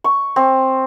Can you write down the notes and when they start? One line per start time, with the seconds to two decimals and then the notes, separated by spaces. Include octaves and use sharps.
0.04 C#6
0.36 C4